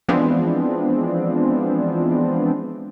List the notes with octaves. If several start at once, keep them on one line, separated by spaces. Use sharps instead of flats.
E3 F3 G#3 B3 C4 D4